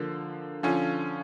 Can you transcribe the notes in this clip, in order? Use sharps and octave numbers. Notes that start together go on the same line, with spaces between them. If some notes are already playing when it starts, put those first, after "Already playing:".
Already playing: D3 F3 A#3
D3 F3 C#4 F4